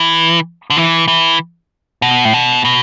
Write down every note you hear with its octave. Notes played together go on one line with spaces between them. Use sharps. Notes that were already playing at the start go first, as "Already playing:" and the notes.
Already playing: E3
D3
E3
E3
B2
A2
B2
B2